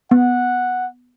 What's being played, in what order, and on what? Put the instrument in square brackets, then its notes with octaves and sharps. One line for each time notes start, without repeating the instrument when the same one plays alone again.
[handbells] B3 [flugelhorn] F#5